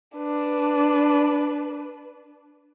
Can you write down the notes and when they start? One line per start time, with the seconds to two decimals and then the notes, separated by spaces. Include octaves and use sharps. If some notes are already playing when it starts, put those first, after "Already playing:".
0.16 D4 B4